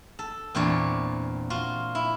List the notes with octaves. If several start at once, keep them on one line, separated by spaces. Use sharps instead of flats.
A4
E2 A#2 C4 D4 C#5 D5
F4 F#4
E4